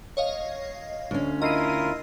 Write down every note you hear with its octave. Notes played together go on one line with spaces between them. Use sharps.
C#5 D#5 F5
D2 C#4
E4 F4 A#4 D#5 C7 D#7